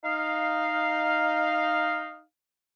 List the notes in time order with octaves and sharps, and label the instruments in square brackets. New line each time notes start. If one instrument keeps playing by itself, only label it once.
[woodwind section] D#4 F5